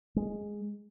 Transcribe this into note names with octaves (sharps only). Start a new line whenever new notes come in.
G#3